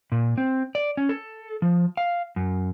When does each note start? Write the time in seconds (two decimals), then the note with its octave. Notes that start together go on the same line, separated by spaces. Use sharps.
0.12 A#2
0.38 C4
0.75 D5
0.97 C#4
1.09 A4
1.62 F3
1.97 F5
2.36 F#2